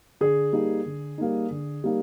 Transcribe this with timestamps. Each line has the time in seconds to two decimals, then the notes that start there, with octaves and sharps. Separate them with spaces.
0.21 D3 G#4
0.53 G3 A#3 D#4
0.86 D3
1.18 G3 A#3 D#4
1.51 D3
1.84 G3 A#3 D#4